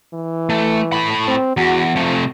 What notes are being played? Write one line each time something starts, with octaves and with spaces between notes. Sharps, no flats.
E3
A3
A2 B5
C4
E2 F#4
C3 F3 A3